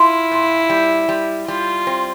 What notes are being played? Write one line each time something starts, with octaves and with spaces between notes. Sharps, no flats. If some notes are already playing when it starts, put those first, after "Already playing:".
Already playing: E4 F4
A#2
G3
G3
G3 F4
C4